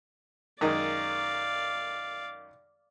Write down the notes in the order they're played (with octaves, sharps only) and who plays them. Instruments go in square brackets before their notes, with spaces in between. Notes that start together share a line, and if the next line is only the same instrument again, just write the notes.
[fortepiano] F#2 D#3 G#3 [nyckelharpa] D5 F5